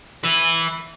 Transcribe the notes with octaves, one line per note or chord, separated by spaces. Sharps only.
B4 E5